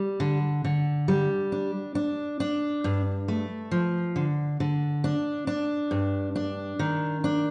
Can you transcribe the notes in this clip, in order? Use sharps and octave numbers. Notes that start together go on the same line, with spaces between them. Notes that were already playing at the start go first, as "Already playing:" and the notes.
Already playing: G3
D3
D3
G3
D4
D4
D4
G2
A3
F3
D3
D3
D4
D4
G2
D4
D#3
D4